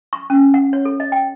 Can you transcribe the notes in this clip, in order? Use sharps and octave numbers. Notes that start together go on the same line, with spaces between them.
C#6
C#4
F#5
C#5
A4
D#5
G5